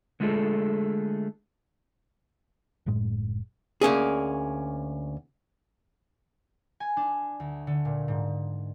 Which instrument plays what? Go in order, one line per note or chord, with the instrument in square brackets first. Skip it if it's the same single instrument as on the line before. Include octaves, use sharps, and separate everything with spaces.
[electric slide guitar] D3 G#3 A3 F4 G#4 A4
[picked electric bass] F#1 F#2 A2 G#3
[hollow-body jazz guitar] D2 A#3 C#4 G#4
[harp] G#5
D4
D2
D3
A#2
G#2